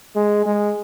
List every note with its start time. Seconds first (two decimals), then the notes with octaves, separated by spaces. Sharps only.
0.15 G#3
0.46 G#3